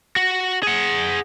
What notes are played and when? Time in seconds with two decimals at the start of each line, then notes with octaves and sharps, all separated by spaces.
0.16 F#4
0.63 G#4 F#5